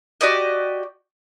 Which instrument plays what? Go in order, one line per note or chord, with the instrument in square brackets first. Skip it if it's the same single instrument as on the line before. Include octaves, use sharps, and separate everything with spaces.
[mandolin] F#4 G4 D5 D#5